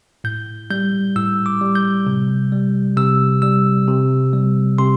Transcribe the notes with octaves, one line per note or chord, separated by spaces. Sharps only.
A2 G6
G3 G6
A2 E6
D6
G3
G6
C3
G3
C3 E6
G3 E6
C3
G3
C3 C6